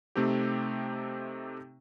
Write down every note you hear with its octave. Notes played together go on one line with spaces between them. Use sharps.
C3 A3 C4 D#4 G4